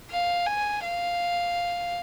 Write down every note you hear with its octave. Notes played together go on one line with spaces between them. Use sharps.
F5
G#5
F5